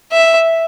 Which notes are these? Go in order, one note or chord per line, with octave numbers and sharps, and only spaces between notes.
E5